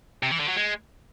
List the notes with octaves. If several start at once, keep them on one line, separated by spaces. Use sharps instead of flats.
C3
E3
D3
F#3
G#3